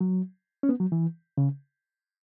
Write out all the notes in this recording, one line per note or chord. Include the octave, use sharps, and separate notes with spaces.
F#3
C#4
B3
F#3
E3
C#3